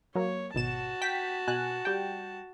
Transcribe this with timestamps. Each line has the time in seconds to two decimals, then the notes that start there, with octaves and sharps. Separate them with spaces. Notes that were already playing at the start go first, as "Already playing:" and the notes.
0.15 F#3 A#3 C#5
0.54 G#1 B2 F#4 A5 E7
1.02 G5 B6
1.48 B2 G#5 F#6
1.85 G3 G5